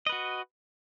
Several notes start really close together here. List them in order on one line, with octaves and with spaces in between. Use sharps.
D#5 B4 F#4